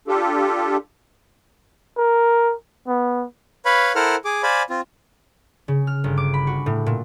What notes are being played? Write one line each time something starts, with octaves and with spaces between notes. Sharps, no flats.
D4 F4 G4 A4
A#4
B3
B4 C#5 F5 B5
E4 A4 A#4 C5 F#5 F6
G#4 D6
C5 D5 F5 G#5 B5
C4 F4
C#3
F6
G1
D6
B5
F#4
A2
A#2